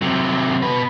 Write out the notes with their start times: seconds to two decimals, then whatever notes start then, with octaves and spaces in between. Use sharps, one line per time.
0.02 C3 F#3
0.63 B2 B4